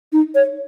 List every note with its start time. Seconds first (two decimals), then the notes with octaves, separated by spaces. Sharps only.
0.13 D#4
0.35 C#5